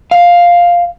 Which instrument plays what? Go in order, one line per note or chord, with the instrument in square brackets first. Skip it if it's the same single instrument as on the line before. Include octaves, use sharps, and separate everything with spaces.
[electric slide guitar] F5